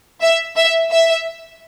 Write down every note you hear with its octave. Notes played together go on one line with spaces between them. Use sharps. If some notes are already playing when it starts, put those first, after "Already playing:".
E5
E5
E5